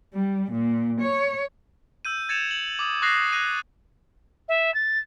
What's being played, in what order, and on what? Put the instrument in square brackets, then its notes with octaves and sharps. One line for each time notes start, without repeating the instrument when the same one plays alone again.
[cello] G3
A#2
C#5
[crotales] E6 G6 D#7
G#6 A6 C#7 E7 F7
F#7
D6 D#6
C#6 D#6 F#6 A6 A#6 C7
D#6 F#6 G#6 A#6 D#7
[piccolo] E5
A6